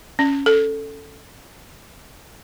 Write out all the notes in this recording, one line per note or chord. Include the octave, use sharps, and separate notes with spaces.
C#4
A4